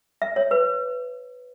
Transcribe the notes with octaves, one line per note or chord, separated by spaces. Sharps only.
E5
C#5
B4